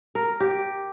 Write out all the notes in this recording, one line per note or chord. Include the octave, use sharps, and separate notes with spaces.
A#4
G4